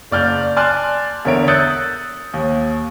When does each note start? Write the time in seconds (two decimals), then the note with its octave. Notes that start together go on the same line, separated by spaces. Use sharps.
0.11 F#1 D5 F6 G6 F7
0.57 D5 G#5 A5 C6 F6 F#6
1.25 E2 D3 A#4 C#5 E5 D7
1.48 D#6 E6 F#6 G6 A6 C#7
2.34 D#2